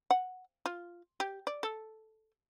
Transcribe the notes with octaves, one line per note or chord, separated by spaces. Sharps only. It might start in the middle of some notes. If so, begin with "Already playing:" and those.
F#5
F4
G4
D5
A4